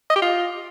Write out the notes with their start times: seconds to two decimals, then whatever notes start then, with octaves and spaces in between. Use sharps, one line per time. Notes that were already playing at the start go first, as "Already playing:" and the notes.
0.10 D#5
0.16 G4
0.22 F4